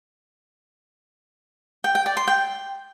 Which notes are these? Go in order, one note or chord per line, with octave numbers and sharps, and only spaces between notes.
G5
G5
D5
C6
G5